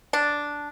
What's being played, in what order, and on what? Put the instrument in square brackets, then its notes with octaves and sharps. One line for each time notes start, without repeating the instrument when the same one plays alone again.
[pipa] D4